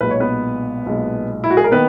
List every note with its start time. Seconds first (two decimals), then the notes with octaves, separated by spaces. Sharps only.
0.01 B1 A#2 G#3 B4
0.11 C#5
0.20 B3 B4
0.86 B1 A#2 G#3
1.44 E4
1.50 F#4
1.57 G#4
1.64 A#4
1.72 D#3 A#3 B3 B4